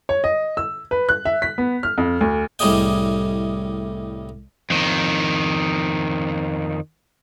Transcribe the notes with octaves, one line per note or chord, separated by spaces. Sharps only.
C#5
D#5
E6
B4
F#6
E5
B6
B3
F6
F2
D2
C2 A2 G3 G#4 D#5 G5
F2 D#3